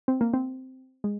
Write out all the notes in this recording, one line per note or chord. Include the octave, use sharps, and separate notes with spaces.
C4
A#3
C4
G#3